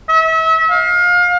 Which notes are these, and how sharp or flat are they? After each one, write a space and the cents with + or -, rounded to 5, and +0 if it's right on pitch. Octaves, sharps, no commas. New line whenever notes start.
E5 -35
F5 +30